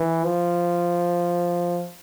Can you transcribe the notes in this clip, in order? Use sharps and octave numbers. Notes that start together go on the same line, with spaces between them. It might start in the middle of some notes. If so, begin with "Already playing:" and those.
Already playing: E3
F3